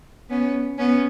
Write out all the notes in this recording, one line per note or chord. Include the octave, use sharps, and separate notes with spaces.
B3 C#4
B3 C#4